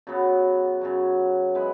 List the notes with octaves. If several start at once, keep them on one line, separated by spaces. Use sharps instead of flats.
F#2 C#3 F#3 B3
F#2 C#3 F#3
G#3 B3 E4 B4